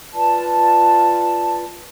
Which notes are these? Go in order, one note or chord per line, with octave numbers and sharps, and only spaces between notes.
F4 B4 D5 A5